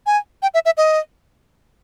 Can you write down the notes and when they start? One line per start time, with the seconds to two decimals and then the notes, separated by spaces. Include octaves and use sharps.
0.06 G#5
0.42 G5
0.54 E5
0.65 E5
0.77 D#5